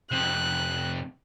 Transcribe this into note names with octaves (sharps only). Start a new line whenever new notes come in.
F2 C3 F#6